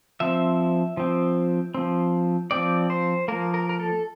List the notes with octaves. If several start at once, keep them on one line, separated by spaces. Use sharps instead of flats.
F3 C4 E5
F3 C4
F3 C4
F3 C4 D5
C5
F3 A#3 A#4
A#4
A#4
A4